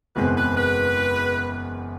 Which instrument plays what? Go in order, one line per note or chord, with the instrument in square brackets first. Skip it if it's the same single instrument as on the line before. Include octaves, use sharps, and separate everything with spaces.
[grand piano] F#1 E2 B2 G#3 C4 [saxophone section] B4
[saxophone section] B4
B4